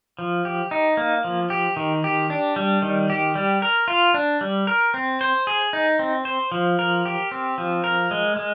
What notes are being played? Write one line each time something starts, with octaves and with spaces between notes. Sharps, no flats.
F3
G4
D#4
A#3
F3
G4
D#3
G4
D4
G3
D#3
G4
G3
A#4
F4
D4
G3
A#4
C4
C5
G#4
D#4
C4
C5
F3
A#4
G4
C4
F3
A#4
G#3
G#3